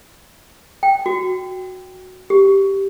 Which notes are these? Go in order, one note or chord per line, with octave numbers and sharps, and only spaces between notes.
G5
F#4
G4